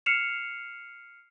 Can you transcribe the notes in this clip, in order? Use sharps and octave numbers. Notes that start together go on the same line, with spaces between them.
F6 C7 C#7 E7 F7